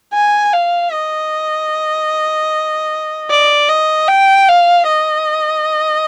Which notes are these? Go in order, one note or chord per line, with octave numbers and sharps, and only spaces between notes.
G#5
F5
D#5
D5
D#5
G5
F5
D#5